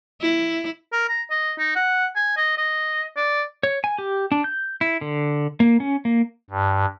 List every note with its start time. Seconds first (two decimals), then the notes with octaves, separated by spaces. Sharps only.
0.22 E4
0.92 A#4
1.09 A#5
1.30 D#5
1.58 D#4
1.75 F#5
2.16 G#5
2.37 D#5
2.57 D#5
3.16 D5
3.63 C#5
3.84 G#5
3.98 G4
4.32 D4
4.44 G6
4.81 E4
5.01 D3
5.60 A#3
5.80 C#4
6.05 A#3
6.50 G2